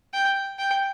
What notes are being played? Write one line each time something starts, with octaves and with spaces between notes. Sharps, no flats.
G5
G5